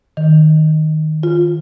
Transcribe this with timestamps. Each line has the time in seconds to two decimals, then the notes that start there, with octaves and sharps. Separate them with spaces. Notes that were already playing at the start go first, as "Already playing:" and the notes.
0.17 D#3
1.23 F4